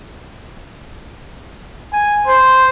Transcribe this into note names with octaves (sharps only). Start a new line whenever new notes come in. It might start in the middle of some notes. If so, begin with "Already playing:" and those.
G#5
C5